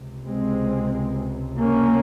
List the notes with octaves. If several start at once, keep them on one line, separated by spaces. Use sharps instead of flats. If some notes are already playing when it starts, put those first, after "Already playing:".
Already playing: C#2 C3
G#3 C4
A#3 C#4